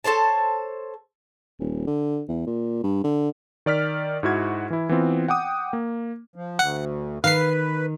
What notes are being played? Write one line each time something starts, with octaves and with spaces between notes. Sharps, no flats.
A4 C5 C#5 A5
D#1
D3
E2
A#2
G2
D3
D#3 D5 F6 B6
G#2 E4 F#4 G#6
E3 E4
E3 B3 C4 F4
F#5 G5 D6 D#6
A#3
F3
D2 F#5
D#3 B4 F5 C7